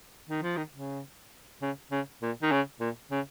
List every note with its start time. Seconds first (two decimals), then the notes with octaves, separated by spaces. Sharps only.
0.30 D#3
0.43 F3
0.57 D#3
0.74 C#3
1.62 C#3
1.92 C#3
2.22 A#2
2.43 D#3
2.52 C#3
2.80 A#2
3.11 C#3